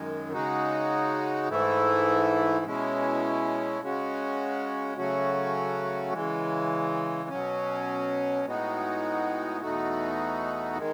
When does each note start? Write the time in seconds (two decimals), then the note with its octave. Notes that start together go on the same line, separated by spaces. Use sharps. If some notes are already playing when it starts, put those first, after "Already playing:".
Already playing: F#2 D#3 G#3
0.32 C#3 G#3 D#4 F#4
1.49 G#2 E3 A3 E4
2.65 B2 G#3 C#4 E4
3.81 C#3 G#3 C#4 F#4
4.97 C#3 F#3 A3 C#4 F#4
6.13 C#3 E3 G#3
7.29 B2 F#3 C#4
8.45 A2 G#3 B3 D#4 F#4
9.61 E2 B2 A3 D#4 F#4
10.77 D#3 G#3